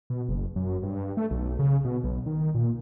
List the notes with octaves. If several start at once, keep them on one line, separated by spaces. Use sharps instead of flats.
B2
F#1
F#2
G2
A3
B1
C#3
B2
B1
D#3
A#2